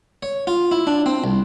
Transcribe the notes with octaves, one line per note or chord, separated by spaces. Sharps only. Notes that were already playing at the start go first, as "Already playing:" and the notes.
C#5
F4
E4
D4
C4
C2